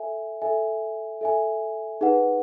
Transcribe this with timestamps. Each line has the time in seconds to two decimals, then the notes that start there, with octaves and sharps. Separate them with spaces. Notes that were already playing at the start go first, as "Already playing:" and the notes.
Already playing: A4 E5 G#5
0.42 A4 E5 G#5
1.21 A4 E5 G#5
2.01 D#4 G#4 B4 F#5